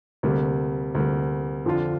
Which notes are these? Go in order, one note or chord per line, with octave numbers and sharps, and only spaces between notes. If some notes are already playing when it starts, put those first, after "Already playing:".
D2 C3 G3 A#3
D2 C3 G3 A#3
F2 D3 F3 D4 F4